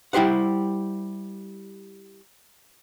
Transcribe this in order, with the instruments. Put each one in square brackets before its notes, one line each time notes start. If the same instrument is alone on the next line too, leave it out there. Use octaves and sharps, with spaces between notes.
[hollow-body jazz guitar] G3 E4 G4 C5 F#5